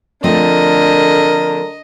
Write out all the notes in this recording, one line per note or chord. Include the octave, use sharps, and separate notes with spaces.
D3 F3 A3 C4 A#4 D#5